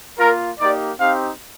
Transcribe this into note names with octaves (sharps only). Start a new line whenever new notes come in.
A#3 F4 A#4
A#3 D#4 G4 D5
C4 D#4 G4 F5